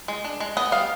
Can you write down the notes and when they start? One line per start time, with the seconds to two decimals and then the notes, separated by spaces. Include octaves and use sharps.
0.08 G#3
0.24 D4
0.40 G#3
0.57 B3 D#5
0.72 G3 F5